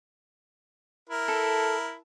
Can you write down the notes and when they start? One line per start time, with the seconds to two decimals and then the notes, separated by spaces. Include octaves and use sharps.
1.10 E4 A#4
1.28 A4